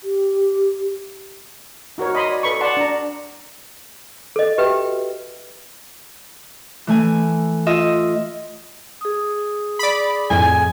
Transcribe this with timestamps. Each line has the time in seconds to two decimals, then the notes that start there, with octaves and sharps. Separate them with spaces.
0.03 G4
1.98 D#4 F#4 A#4 C#5
2.15 D#5 B5 C6 D#6
2.29 D5
2.43 A4 B4 B5 C#6
2.61 D5 F#5 A5 C6
2.77 D4 A#5
4.36 A4 D#5
4.58 F#4 G4 B4 E5 G5
6.87 E3 A3 G#5
7.67 F4 D#5 E5
9.01 G#4 D#6
9.79 D5 B5
10.30 F2 A2 G#5